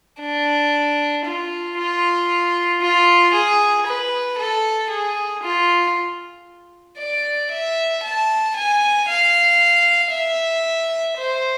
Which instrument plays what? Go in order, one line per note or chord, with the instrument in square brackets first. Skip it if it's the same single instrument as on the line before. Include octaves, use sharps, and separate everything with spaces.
[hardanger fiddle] D4
F4
F4
F4
G#4
B4
A4
G#4
F4
D5
E5
A5
G#5
F5
E5
C5